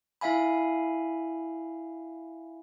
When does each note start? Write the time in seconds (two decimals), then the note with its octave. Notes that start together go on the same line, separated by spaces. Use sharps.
0.21 E4 E5 F5 G#5 B5